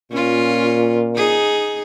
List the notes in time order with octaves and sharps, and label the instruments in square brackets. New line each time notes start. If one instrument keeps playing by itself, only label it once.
[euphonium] A#2 [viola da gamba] C#4 F4
[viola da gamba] D#4 G#4